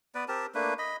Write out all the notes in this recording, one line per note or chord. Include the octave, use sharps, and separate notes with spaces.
B3 B4 D5
C4 G4 A#4 A5
A3 A#3 D4 B4
D#5 B5